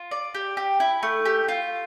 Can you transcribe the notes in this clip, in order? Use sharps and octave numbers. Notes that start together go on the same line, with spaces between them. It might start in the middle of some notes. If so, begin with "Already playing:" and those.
Already playing: F4
D5
G4
G4
E4
A3
G4
F4